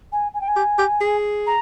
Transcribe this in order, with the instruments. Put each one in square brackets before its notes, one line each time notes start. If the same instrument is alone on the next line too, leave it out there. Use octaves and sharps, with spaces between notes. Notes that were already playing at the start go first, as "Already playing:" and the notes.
[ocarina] G#5
G#5
G5
G#5
[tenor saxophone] G4
G4
G#4
[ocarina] A#5